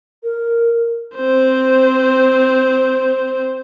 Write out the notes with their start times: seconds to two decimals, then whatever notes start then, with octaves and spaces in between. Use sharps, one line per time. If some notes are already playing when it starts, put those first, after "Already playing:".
0.23 A#4
1.16 C4 C5